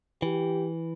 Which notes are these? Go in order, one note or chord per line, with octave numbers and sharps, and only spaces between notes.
E3 G4